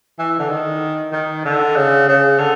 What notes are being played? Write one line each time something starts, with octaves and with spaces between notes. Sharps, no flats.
E3
D3
D#3
D#3
D3
C#3
C#3
D3